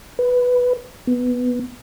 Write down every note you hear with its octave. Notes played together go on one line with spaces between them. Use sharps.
B4
B3